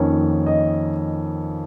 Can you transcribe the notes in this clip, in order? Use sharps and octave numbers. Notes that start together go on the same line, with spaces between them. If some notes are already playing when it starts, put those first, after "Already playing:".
Already playing: F2 D#3 A#3 C#4
D#5